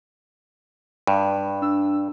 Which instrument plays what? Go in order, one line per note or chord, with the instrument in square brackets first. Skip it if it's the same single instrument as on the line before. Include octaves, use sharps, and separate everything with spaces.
[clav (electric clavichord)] G2
[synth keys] D4 E6